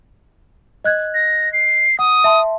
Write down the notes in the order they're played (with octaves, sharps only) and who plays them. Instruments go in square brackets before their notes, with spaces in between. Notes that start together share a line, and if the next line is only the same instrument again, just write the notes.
[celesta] D#5 F#6 G#6
[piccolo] A#6
C7
[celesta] F#5 [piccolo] D#6
[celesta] E5 A5 C6